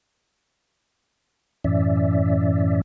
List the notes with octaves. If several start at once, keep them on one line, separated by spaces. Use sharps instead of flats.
F#2 A2 E3 C#4 D5 E5